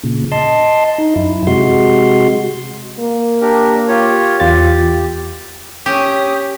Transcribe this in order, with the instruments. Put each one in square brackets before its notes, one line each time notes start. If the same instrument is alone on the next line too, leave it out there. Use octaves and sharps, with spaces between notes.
[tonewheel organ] A#2 C#3
D#5 A5 C6
D#4
F#2 E4
C3 G#3 F#4 C6
[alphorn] A#3
[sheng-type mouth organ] D4 G4 A#4
F4 G4 C#5
[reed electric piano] E2 F4 A6 [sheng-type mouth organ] G4
[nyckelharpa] C#4 D#6 [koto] G4